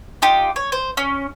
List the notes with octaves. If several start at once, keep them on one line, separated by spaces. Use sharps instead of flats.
D#4 F4 G4
C#5
C5
C#4